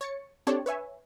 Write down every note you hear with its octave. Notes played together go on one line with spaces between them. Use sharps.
C#5 A6 C#7
C4 D4 G4 A4 C#5 D5
B4 C#5 E5 G#5